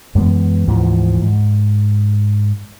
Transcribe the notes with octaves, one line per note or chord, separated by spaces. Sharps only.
F#2 E3 G#3 B3
D2 G#2 E3 F3
G#2